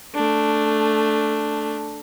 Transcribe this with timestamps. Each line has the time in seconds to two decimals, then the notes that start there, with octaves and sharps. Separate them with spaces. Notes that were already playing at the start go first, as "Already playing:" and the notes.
0.15 A3 D4